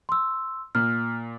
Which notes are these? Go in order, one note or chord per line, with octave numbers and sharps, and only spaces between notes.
C6 E6
A#2 F6